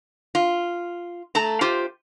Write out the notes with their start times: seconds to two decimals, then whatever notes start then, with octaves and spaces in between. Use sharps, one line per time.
0.35 F4
1.35 A3 A5 A#5
1.61 F4 G4 C5